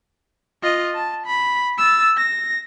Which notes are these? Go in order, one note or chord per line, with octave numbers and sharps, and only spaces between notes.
F4 D#5
A5
B5
E6 A6
A#6